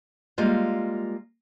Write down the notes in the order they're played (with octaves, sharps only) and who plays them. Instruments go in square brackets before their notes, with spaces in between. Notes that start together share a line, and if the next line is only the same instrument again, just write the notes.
[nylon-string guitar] G3 G#3 A#3 F4